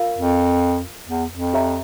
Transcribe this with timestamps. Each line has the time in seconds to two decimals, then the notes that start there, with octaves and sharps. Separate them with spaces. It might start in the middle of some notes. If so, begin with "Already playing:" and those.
Already playing: F4 A#4 F5
0.19 F2
1.09 E2
1.32 F2
1.53 G4 C#5 E5 A#5